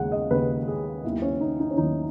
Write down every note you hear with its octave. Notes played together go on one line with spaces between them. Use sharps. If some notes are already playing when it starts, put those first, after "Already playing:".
Already playing: D#2 C#3 G#3 F#5
D#5
D#2 C#3 G#3 B4
G#4
D#2 D#3 F#3 B3 E4
C#4
D#4
D#4
C#4
D#2 D#3 F#3 B3 D#4